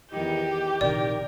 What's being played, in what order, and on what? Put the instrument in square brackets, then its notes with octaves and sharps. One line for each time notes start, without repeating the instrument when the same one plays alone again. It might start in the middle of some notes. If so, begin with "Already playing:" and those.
[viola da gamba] E2 D#3 D#4 [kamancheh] G4
[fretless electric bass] A#1 C3 D#3 [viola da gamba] A#4 [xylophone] D5